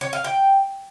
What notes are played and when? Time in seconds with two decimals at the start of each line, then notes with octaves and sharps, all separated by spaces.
0.01 C#5
0.13 F5
0.24 G5